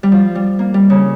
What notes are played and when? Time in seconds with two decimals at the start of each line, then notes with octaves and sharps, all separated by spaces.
0.03 G3
0.12 F3
0.35 G3
0.59 A#3
0.74 G3
0.90 C#3